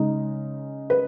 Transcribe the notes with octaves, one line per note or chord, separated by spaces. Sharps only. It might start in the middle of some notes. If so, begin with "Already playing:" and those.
Already playing: C#3 G#3 D#4
B4